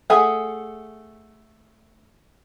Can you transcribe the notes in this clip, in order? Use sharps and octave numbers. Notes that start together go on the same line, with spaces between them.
A3 G#4 E5 F#5 G#5